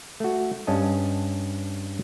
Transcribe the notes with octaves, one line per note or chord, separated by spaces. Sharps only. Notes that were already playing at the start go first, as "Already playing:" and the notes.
A3 F#4
G2 C#4 D4 D#5 A5